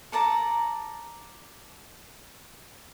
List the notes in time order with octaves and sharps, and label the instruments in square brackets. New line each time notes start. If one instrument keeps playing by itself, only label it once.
[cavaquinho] A4 D5 A5 A#5